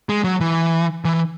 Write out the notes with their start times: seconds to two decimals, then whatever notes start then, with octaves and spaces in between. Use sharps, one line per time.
0.09 G#3
0.24 F#3
0.41 E3
1.05 E3